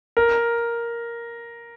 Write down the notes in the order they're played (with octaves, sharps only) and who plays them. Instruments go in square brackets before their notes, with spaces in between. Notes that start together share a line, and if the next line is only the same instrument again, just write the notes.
[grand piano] A#4